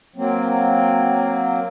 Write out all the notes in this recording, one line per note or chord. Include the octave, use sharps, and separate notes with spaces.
F#3 A#3 C4